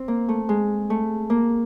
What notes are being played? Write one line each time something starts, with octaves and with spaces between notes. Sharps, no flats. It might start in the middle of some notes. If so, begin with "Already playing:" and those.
Already playing: C4
A#3
A3
G#3
A3
A#3